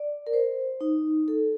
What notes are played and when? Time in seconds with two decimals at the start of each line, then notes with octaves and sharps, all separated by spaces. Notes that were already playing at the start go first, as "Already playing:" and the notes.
Already playing: D5
0.27 A#4
0.33 C5
0.81 D#4
1.28 A4